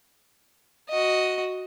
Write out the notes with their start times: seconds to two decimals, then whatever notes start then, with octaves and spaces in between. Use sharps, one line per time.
0.89 F#4 D#5